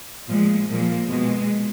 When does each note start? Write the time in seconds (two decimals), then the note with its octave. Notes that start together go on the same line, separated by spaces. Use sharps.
0.28 A#2 F3 G#3
0.69 A#2 F3 A#3
1.09 B2 G#3